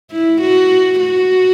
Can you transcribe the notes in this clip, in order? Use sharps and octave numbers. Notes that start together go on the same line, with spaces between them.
E4
F#4
F#4